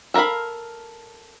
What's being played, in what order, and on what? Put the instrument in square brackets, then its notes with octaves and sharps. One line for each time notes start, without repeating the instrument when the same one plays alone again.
[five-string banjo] A4 A#4 D5 F5 B5